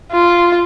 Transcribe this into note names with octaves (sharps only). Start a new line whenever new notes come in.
F4